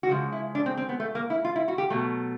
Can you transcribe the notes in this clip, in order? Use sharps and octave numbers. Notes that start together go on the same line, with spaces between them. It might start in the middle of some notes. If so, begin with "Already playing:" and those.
F#4
C#3 F3 G#3 F4
E4
D4
C4
C4
B3
A3
A#3
E4
F4
E4
F#4
G4
B2 F#3 A3